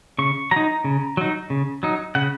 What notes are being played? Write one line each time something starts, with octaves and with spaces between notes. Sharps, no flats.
C#3 C#6
F#3 D#4 A#5
C#3
F#3 D#4
C#3
F#3 D#4
C#3 F#5